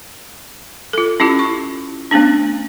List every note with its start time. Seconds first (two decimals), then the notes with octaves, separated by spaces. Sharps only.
0.93 F4 A4
1.20 C#4 E4 F4 G4
1.39 C#6
2.11 A3 B3 C#4 D4